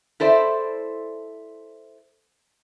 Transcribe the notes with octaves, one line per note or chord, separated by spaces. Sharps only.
E4 A4 C5 D5 E5